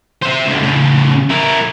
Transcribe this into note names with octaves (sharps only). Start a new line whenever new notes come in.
C5 E5
C#2 D3
A2 C#3
E4 A#4